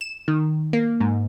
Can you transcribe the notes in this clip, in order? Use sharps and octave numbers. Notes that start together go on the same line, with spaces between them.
E7
D#3
A#3
G#2